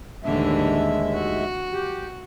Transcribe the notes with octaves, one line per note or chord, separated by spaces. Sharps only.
D#2 A2 D3 E3 G#3 E5
F#4
G4